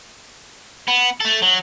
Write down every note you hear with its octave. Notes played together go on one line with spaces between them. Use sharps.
B3
A3 A4
F#3